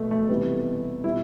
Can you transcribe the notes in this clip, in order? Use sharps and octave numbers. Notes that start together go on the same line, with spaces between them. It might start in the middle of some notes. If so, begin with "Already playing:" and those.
Already playing: B2 A3
A3
C3 E3 G3 B3
B2 G3 E4